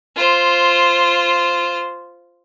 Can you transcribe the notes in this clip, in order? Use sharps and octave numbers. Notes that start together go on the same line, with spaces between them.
F4 C5